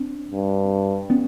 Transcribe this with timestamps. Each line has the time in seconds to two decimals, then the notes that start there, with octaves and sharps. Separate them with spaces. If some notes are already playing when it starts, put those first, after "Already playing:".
Already playing: C4 D4
0.31 G2
1.10 B3 C#4